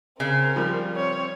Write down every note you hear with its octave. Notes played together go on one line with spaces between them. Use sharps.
C#3 C4 A#4
F3 G3
C4 C#5